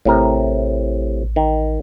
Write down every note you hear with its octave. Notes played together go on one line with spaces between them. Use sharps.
A1 A2 C3 A#4
D#3